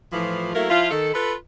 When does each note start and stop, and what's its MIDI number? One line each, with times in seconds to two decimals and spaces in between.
0.13 0.53 45
0.13 0.53 52
0.13 0.53 53
0.54 0.69 54
0.54 0.69 57
0.54 0.69 58
0.54 0.69 64
0.54 0.69 70
0.69 0.91 53
0.69 0.91 64
0.69 0.91 65
0.91 1.11 51
0.91 1.11 69
1.14 1.33 65
1.14 1.33 69
1.14 1.33 71